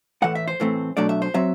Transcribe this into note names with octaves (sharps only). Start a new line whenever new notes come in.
A2 E3 A3 F#5
E5
C5
A2 E3 A3 C4
B2 F#3 A3 D4 D5
E5
C5
F#3 C4 E5